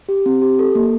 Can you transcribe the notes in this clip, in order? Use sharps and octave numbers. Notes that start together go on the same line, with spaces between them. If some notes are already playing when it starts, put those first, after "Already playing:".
G4
C4
G4
A4
A#3